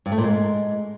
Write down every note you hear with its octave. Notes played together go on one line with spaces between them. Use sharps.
G2
A3
A#2
G#3